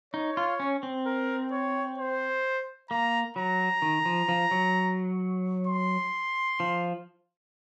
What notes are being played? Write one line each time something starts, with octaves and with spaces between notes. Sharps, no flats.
D#4 C#5
F4
C#4
C4
A#4
C#5
C5
A#3 A#5
F#3 A#5
D#3
F3
F3
F#3
C6
F3